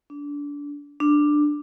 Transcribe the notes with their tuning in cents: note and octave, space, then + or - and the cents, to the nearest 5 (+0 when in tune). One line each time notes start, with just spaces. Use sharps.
D4 -25
D4 +10